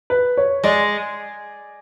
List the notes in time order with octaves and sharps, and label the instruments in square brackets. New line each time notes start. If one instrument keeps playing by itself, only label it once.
[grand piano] B4
C#5
[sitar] G#3 [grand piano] D5